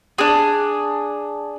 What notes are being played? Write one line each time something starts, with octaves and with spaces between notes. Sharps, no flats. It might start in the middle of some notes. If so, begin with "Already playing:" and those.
D4 G#4